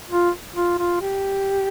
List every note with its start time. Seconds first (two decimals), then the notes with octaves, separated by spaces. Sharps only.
0.10 F4
0.56 F4
0.79 F4
1.01 G4